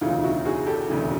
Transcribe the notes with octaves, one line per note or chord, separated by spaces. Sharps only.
E1 D2 C#3 E3 D#4 F4
E4 F#4
F#4 G#4
G4 A4
E1 D2 C#3 E3